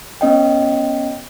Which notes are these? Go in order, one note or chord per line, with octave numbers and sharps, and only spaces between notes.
B3 C#4 D#5 G5